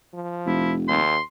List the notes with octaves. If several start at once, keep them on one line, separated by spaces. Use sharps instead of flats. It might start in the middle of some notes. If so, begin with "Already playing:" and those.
F3
F1 E4
D#2 C6